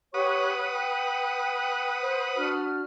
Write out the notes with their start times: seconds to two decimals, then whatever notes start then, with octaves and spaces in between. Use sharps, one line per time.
0.14 G4 B4 C#5 F#5 C#6 D#6
0.73 G5
2.02 C5
2.36 D4 F#4 F6